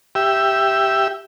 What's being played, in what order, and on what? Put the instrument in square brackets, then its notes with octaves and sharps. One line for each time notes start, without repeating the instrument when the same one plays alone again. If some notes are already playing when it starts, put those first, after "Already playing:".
[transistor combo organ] G4 E5